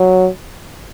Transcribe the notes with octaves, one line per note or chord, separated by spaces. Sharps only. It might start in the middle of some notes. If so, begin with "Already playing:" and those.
Already playing: F#3